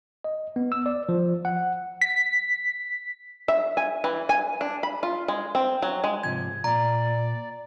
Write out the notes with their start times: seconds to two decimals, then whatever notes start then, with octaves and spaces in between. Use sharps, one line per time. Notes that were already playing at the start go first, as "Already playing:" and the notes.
0.24 D#5
0.56 B3
0.72 E6
0.86 D5
1.09 F3
1.45 F#5
2.01 B6
3.48 E5
3.77 G#5
4.04 E3
4.29 G#5
4.61 D4
4.83 B5
5.03 F4
5.28 G#3
5.55 C4
5.82 F#3
6.04 G#3
6.23 G#2 C3 F3 G#6
6.64 A#2 D5 A#5